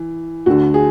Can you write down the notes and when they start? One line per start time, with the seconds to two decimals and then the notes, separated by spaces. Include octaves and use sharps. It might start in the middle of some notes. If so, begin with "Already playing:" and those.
Already playing: E3
0.46 D2 D3 F#4
0.74 G#4